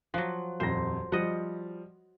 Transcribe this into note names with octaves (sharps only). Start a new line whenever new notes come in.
F3 F#3 F#6
D#1 F2 C5 A#6
F3 G3 D#5 F#5